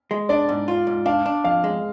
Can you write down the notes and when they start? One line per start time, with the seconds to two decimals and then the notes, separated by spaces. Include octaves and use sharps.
0.11 G#3
0.29 D4 D5
0.49 G#2
0.68 F4
0.87 G#2
1.06 D4 F5
1.26 D4
1.44 F2 F5
1.64 G#3